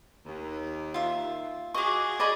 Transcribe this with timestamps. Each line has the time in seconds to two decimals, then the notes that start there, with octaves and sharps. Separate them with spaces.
0.25 D#2
0.94 F4 E5
1.74 F#4 G#4 D#5 C#6 D6
2.20 G#4 D5 D#5 B5